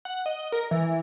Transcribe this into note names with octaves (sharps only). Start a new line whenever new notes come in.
F#5
D#5
A#4
E3